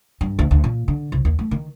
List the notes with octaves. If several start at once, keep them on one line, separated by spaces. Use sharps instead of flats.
G2
D2
D2
A#2
D3
C2
D#2
A3
D#3